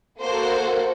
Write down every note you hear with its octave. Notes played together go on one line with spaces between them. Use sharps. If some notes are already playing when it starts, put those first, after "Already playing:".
A#3 F#4 A4 C5